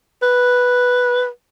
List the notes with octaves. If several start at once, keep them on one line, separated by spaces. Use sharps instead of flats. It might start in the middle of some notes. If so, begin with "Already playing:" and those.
B4